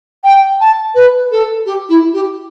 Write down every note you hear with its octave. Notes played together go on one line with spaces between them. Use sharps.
G5
A5
B4
A4
G4
E4
G4